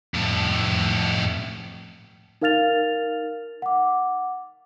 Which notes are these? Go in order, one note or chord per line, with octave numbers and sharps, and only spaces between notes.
F2 A2
D#4 A#4 F5 F6 A6 F7
F#5 D6